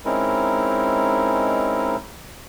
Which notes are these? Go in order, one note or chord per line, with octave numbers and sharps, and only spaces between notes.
G#3 C4 C#4 D#4 E4 A#4